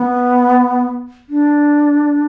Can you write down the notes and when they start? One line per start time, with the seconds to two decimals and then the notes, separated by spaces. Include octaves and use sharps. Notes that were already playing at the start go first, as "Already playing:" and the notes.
Already playing: B3
1.29 D4